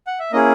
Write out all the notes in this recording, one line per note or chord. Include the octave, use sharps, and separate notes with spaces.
F#5
E5
A#3 C#4 E4 G#4 D#5